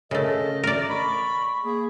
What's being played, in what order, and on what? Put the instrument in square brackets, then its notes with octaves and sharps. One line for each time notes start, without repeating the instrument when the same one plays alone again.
[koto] C#3 A3 [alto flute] A#4 [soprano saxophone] D#5
[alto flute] A3 [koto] A#4 D5
[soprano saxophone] B5 [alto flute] C#6
[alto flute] A#3 [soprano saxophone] G#4